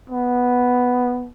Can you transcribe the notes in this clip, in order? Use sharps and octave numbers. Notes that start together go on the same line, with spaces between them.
B3